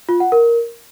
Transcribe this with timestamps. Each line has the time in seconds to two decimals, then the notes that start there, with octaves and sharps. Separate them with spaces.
0.09 F4
0.20 F#5
0.32 A#4